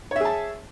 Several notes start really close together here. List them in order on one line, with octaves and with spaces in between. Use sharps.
C#5 E5 G#4 A5